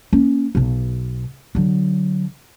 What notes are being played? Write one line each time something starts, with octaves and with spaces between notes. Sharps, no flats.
A#3 C#4
B1 B2
D3 F#3